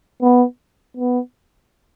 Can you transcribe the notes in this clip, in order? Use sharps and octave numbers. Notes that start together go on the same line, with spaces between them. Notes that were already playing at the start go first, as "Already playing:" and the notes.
B3
B3